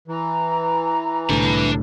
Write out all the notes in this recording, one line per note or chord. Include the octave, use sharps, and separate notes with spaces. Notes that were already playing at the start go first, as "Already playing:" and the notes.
E3 A#5
C2 A2 D3 D4 B5